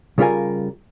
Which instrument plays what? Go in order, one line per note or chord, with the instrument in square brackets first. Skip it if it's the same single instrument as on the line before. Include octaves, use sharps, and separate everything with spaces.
[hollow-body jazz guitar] C#3 G3 F4 A#4 G#5